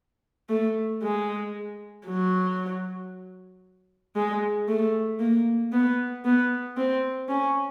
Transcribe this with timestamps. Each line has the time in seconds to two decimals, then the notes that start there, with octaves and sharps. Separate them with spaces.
0.49 A3
1.03 G#3
2.07 F#3
4.16 G#3
4.68 A3
5.20 A#3
5.72 B3
6.25 B3
6.77 C4
7.29 C#4